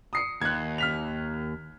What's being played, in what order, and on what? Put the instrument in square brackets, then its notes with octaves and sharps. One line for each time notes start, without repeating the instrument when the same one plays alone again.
[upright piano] D#6 C7 C#7
[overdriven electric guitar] D#2 [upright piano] F#6 G#6
[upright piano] F6 B6 F7